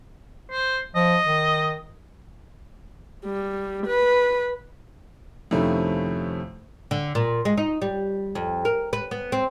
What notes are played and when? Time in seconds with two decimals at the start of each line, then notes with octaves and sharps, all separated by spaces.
0.51 C5
0.95 F3 D#5
1.26 D#3
3.25 G3
3.86 B4
5.51 F2 C3 D#3 A3 C#4 E4
6.91 D3
7.15 A#2
7.45 G#3
7.58 D#4
7.82 G3
8.35 F2
8.65 A#4
8.93 B4
9.11 B3
9.32 C4